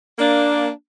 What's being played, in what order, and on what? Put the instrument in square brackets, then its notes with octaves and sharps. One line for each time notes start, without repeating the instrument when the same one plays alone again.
[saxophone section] A#3 D4